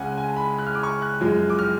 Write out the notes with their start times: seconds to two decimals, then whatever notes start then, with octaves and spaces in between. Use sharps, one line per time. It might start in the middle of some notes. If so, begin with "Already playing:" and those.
Already playing: C#2 C#3 G#3 C#4 F#5 G#5
0.18 G#5
0.28 A5
0.36 B5
0.58 F#6
0.67 F6
0.75 D6
0.83 C#6
1.02 F#6
1.21 F#2 F3 G#3
1.50 D6
1.59 F6